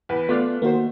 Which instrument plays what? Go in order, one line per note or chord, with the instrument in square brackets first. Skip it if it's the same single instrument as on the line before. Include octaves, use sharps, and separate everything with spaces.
[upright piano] E2 B4
[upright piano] A3 [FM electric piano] B3 F#6 [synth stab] F4 D5 F5
[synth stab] D#3 C5 [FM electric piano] A#3 F#4